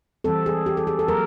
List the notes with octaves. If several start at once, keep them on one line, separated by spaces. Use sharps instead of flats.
E3 G3 C4 A4
G#4
G4
A4
G#4
A4
F#3 A#3 A#4